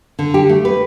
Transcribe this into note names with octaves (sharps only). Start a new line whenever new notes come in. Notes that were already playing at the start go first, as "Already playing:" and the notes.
D3
G4
A3
B4